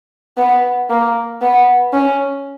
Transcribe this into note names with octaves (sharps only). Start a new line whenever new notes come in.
B3
A#3
B3
C#4